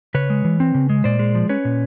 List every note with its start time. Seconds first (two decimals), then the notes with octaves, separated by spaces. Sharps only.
0.14 C#3 B4 C#5
0.30 G#3
0.45 E3
0.60 C4
0.75 C#3
0.90 G#3
1.04 A#2 C5 D5
1.19 G#3
1.35 F3
1.49 C#4 B4 C#5
1.65 A#2